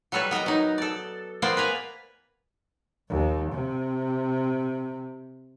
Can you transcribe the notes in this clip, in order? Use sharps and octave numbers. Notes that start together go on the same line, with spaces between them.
F#3 G3 A4 B4 C#5
B3 A#4 D#5 A#5
F#3 D#4
A4 D5
A#3 B3 C5 D5 G5
B4 G#5 A#5
D#2
C3